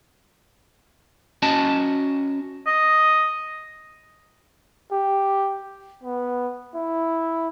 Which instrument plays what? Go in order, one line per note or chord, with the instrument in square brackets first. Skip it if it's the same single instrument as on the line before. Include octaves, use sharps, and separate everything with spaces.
[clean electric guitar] C#4 F#4 D#5 A5
[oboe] D#5
[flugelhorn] G4
B3
E4